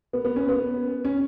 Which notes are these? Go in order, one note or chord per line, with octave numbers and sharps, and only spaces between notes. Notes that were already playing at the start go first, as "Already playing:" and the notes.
B3
B3
C#4
B3
C#4